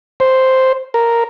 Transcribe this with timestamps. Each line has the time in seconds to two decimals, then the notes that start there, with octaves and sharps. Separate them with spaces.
0.20 C5
0.94 A#4